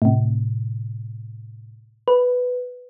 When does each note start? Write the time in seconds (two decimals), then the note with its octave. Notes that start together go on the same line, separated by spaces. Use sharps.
0.02 A2 C3
2.08 B4